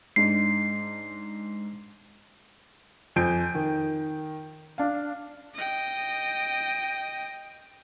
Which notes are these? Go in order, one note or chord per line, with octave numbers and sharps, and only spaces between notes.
G#2 D4 C7
F2 C5 G#5 G6 D7
D#3
D4 F5
D#5 G5